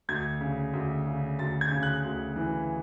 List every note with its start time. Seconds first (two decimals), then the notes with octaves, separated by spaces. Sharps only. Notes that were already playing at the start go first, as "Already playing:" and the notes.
0.09 D2 G#6
0.41 C#3
0.73 D2
1.06 C#3
1.39 D2 A6
1.61 G#6
1.72 C#3
1.83 F#6
2.05 D2
2.36 E3